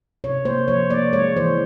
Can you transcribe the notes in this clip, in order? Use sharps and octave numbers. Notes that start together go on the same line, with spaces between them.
C3 C#5
A#3 C5
F3 C#5
A#3 D5
G#3 C#5
E3 C5